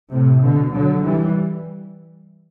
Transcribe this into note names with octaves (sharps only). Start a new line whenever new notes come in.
A2 C3
B2 D3
D3 F#3
E3 G3